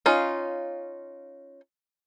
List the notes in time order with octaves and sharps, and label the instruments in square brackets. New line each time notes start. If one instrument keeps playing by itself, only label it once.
[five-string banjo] C#4 D#4 F4 F5